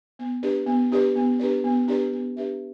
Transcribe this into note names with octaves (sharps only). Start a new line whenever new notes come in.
B3
D4 G4 B4 D5
B3
D4 G4 B4 D5
B3
D4 G4 B4 D5
B3
D4 G4 B4 D5
B3
D4 G4 B4 E5